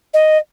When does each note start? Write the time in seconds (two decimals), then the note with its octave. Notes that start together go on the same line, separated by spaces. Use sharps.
0.14 D#5